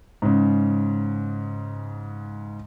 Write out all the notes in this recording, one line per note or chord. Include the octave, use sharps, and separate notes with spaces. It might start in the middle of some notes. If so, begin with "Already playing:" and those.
G#2 C#3